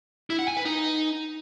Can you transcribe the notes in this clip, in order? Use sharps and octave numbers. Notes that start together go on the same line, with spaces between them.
E4
F#5
G#5
B4
D#4